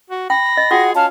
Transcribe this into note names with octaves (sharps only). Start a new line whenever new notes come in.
F#4
G5 B5 A#6
D#5
F4 F#4 G#4 F#5 G5
C#4 F5 A5